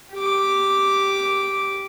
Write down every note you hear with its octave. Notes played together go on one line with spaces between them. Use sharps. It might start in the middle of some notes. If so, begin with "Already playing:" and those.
G4 D6